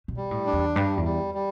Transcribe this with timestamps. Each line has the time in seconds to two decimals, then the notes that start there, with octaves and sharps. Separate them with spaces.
0.08 B2
0.17 G3
0.31 A2
0.46 D4
0.53 E2
0.75 G2 G3
0.97 E2
1.04 G3
1.34 G3